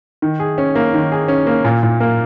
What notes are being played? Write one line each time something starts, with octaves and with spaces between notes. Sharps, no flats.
D#3
G#4
C#4
A#3
D#3
G#4
C#4
A#3
A#2
A#2
A#3